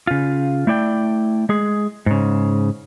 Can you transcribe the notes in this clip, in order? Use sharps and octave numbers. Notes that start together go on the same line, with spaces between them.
C#3 F4
A3 E4 D5 G5
G#3 G#4
G#2 C#3